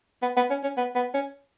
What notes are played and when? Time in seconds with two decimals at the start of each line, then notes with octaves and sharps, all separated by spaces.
0.22 B3
0.37 B3
0.50 C#4
0.63 C#4
0.77 B3
0.95 B3
1.14 C#4